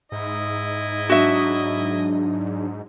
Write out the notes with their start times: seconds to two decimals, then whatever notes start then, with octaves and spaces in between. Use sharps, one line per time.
0.12 G#2 E4 D#5
1.09 F#3 D4 F#4 E5